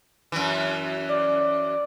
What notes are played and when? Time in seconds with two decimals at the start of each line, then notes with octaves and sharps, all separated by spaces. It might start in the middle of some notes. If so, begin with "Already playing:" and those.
0.32 F#2 E3
1.09 D5